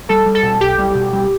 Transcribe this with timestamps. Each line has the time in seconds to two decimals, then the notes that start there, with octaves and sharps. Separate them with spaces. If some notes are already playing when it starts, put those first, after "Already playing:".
0.09 G3 A4
0.26 G3
0.35 A4
0.43 B2
0.61 B1 G4
0.78 G3
0.95 B2
1.13 G3